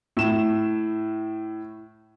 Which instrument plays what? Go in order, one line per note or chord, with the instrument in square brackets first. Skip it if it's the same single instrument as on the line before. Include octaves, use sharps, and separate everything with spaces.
[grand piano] A2 E7